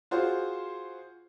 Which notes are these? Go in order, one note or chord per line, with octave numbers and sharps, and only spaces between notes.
F4 F#4 G#4 C5